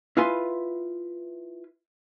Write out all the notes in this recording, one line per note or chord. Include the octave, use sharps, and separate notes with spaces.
E4 F4 B4 G#5 C6